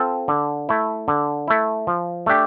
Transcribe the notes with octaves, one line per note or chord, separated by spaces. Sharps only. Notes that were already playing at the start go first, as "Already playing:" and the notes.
Already playing: C4 F4 A4
D3
A3 E4
D3
A3 E4
F3
A3 D4 G4